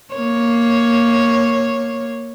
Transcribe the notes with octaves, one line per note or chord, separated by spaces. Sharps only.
A#3 C#5